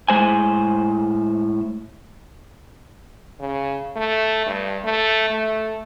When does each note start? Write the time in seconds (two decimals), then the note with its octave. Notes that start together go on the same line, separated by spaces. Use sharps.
0.08 A2 G#3 C5 G#5
3.40 C#3
3.96 A3
4.46 G2
4.84 A3
5.30 A3